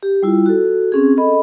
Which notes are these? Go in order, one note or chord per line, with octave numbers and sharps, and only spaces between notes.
G4
G3 E4 F4
F#4 A4
C4 C#4 G#4
A4 D#5 B5